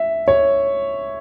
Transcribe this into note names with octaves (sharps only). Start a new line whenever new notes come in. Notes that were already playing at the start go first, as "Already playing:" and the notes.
Already playing: E5
C#5